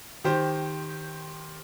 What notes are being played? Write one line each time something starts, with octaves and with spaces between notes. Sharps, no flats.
D#3 G4 C5